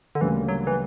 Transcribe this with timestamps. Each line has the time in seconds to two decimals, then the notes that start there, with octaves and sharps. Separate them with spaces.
0.15 D3
0.21 D2 C#3 E3 G3 A#3 D4
0.48 F#3
0.67 E3